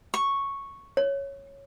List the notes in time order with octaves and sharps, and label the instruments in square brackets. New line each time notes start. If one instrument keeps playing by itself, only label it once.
[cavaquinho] C#6
[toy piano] C#5